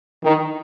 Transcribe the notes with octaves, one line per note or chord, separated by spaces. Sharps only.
D#3